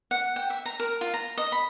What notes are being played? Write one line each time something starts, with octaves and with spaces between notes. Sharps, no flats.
F#5
G5
E5
A#5
A#4
F4
A#5
D#5
B5